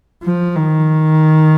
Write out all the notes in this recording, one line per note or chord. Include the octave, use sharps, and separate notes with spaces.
F3
D#3